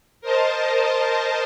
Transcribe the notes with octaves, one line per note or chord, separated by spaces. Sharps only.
A#4 C5 D#5 A5